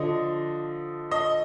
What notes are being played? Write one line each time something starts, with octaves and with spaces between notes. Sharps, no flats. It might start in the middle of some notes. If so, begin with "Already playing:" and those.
Already playing: D3 F3 D#5
D#5